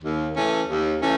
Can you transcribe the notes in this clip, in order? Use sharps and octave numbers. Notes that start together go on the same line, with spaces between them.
D#2
C#3 E3 A3 C#4
D#2
C#3 E3 A3 C#4